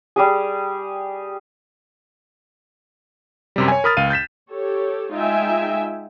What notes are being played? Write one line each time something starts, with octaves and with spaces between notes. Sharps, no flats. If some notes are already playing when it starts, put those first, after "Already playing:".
G3 G4 G#4
F#2 C3 G3
C#5 G#5
A#4 B5 D#6 F6 A6
C#2 F5 D#7
G6 A6 B6 E7
G4 A4 C#5
G#3 D#4 F4 E5 G5 G#5